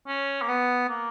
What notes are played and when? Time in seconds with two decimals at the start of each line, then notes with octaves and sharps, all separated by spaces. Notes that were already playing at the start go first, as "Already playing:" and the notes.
0.07 C#4
0.42 A#3
0.48 B3
0.89 A#3